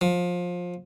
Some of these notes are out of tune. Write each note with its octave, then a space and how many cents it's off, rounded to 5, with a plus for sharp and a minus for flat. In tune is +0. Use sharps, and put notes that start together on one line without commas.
F3 +20